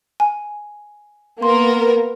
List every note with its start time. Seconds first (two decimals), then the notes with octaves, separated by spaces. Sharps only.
0.20 G#5
1.42 A#3 B3 A#4 C6